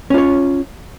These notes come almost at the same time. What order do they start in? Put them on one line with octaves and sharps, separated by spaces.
C#4 F4 C#5